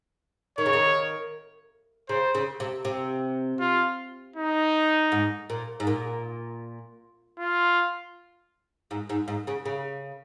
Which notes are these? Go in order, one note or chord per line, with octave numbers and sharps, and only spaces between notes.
D#3 C#5
C#3
D#3
C#3 C5
C#3
C3
C3
F4
D#4
G#2
A#2
G#2
A#2
F4
G#2
G#2
G#2
C#3
C#3